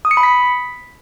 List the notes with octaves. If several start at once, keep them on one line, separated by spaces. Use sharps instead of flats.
D#6
C#7
B5
B6